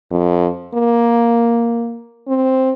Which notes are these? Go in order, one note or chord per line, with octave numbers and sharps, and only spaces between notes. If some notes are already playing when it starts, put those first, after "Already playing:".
F2
A#3
C4